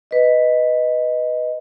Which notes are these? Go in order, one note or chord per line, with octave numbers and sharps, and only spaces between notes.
B4 D#5